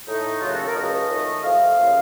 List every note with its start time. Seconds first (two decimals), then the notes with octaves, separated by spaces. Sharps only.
0.07 A2 A3 D#4
0.41 D#2 C#3 F#3 A3 F4
0.49 F#4
0.58 A4
0.67 A#4
0.75 C#2 C#3 F#3 A3 D#5
1.09 F2 D#3 A3
1.43 F2 C3 F3 A3 F5
1.76 C#3 F3 A#3